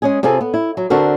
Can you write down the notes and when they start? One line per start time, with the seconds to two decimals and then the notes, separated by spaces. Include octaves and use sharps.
0.02 G#3 C#4 G#4
0.23 C3 C4 F4 G#4 A4
0.41 B3
0.54 E4
0.77 F#3
0.90 D3 C4 D4 F#4 A4 A#4